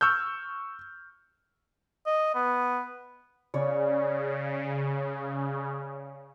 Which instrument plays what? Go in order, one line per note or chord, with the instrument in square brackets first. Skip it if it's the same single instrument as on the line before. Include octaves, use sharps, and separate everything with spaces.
[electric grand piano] C#6 E6 F6 G6
[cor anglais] D#5
B3
[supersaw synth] C#3 [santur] C#5 D5